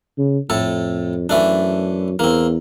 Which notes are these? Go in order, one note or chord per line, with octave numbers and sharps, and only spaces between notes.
C#3
F2 A2 A4
F#2 E3 A3 D4
E2 A#3 C4